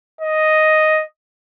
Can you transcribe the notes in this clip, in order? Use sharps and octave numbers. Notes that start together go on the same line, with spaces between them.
D#5